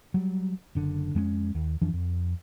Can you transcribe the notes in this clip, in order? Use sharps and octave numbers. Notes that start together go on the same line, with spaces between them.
F#3 G3
F#1 D3
F2 G#3 C4 C#4
D#2
F2 E3 F3 D4
F2